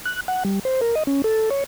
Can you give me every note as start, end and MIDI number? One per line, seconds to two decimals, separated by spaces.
0.05 0.20 90
0.28 0.44 78
0.45 0.59 55
0.65 0.81 72
0.81 0.95 70
0.95 1.03 75
1.07 1.22 61
1.24 1.50 69
1.50 1.64 73